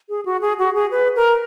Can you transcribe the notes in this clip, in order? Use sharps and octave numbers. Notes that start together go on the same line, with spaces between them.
G#4
F#4
G#4
F#4
G#4
B4
A#4